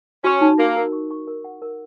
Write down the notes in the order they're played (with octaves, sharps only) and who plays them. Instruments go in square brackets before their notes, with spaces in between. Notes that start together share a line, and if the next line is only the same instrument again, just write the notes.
[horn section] C#4 [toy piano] F#4
[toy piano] D#4
[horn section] A#3 [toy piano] F#4
[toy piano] A#4
C#6
C#6
A#4
F#5
A#4